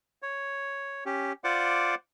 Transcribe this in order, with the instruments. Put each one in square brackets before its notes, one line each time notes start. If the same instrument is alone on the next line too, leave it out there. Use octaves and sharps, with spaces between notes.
[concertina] C#5
C#4 G4
F4 C5 D5 F#5 D6